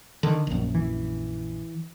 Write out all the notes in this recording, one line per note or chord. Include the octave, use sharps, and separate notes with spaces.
D3 D#3
A#1 F#2
E3